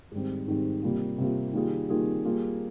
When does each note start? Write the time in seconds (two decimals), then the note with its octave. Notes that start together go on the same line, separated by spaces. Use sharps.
0.12 G#2 D#3 G3 C4
0.47 G#2 D#3 G3 C4
0.82 C3 G3 A#3 F4
1.18 C3 G3 A#3 F4
1.53 D#3 G3 A#3 F4 G#4
1.89 D#3 G3 A#3 F4 G#4
2.24 G3 A#3 F4 G#4